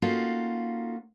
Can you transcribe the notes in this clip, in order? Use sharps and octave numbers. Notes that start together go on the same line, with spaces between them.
A#3 C#4 D#4 F4 F#4 A4